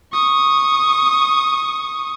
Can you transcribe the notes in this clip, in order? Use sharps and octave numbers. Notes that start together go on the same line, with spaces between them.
C#6 D#6